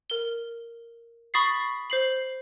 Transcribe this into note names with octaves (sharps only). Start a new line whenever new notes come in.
A#4 G7
B5 C#6 D#6 A6 B6 C7
C5 C7 F#7